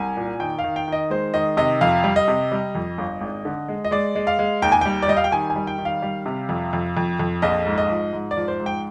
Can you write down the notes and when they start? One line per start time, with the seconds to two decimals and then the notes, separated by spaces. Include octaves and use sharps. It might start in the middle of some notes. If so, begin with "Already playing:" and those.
Already playing: C2 G#5
0.17 A#2
0.40 D#3 G5
0.59 F5
0.64 D#3
0.76 G5
0.88 D#3 D#5
1.10 G#3 C5
1.34 D#3 D#5
1.57 C3 D#5
1.81 F2 F5
2.04 G3
2.16 D#5
2.28 C3
2.52 G3
2.75 F2
2.98 G1
3.21 G#1
3.45 D3
3.68 G#3
3.85 D#5
3.91 G#3 D5
4.15 G#3
4.27 F5
4.39 G#3
4.62 D#2 G5
4.72 G#5
4.81 G3 G5
5.02 D5
5.08 G3 D#5
5.17 F5
5.24 G5
5.32 D#3 G#5
5.50 G#5
5.56 G3
5.67 G5
5.78 D#3
5.85 F5
6.02 G3
6.26 C3
6.49 F2
6.73 F2
6.97 F2
7.19 F2
7.42 A#1 D#5
7.66 G#2
7.78 D#5
7.90 F3
8.13 G#2
8.31 D5
8.37 F3
8.48 C5
8.60 G#2
8.66 G5